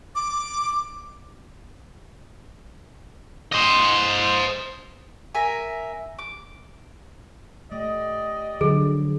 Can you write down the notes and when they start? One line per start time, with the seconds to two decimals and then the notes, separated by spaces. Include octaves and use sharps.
0.15 D6
3.52 C5 D#5
5.35 A#4 E5 G#5
6.19 D6
7.72 A3 G4 D5 D#5
8.61 D3 F3 F#3 G#4